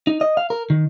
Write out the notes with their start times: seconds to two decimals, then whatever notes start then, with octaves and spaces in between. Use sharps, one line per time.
0.07 D#4
0.21 D#5
0.37 F5
0.50 A#4
0.70 D#3